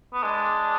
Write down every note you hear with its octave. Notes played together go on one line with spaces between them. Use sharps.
B3
G#3 D4